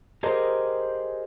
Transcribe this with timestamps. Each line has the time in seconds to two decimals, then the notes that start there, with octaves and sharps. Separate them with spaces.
0.23 G4 G#4 A#4 C5 D#5